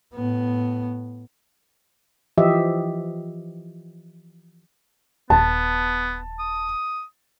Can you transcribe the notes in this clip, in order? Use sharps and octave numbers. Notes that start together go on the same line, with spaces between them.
A2 B3
E3 F3 G4 D#5 E5
D#1 B3 A5
D#6